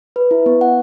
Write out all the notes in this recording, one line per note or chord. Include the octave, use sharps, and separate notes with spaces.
B4
E4
B3
F#5